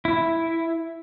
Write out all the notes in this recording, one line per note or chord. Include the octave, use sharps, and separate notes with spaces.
E4